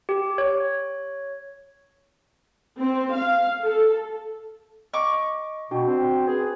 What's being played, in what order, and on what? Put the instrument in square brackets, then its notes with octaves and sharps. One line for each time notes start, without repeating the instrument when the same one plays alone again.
[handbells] G4
C#5
[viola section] C4
F5
A4
[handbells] D#5 [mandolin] C#6 D6
[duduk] B2 [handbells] D4 F#4 G5
[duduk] C4
[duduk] G#4 [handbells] B4